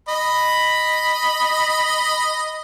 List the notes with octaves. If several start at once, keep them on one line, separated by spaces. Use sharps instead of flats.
D#5 B5